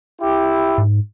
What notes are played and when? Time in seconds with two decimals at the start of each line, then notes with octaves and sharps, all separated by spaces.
0.21 E4 G4
0.78 G#2